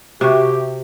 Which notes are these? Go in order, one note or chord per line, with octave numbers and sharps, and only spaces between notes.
C3 F#4 G4 E5 C#6